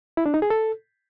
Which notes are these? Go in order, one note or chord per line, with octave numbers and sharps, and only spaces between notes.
E4
D4
D#4
G#4
A4